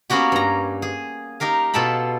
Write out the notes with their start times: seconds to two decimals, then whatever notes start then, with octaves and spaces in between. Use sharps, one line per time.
0.10 A#3 B3 C#4 F#4 G4
0.32 G2 A#5
0.82 G#4
1.40 D#4 G4 A#4 F5
1.74 B2 F4 A4 G5 A5 B5